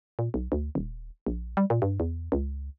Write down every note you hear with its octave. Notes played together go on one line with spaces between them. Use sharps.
A#2
B1
D2
D#1
A#1
G3
A#2
G2
E2
C#2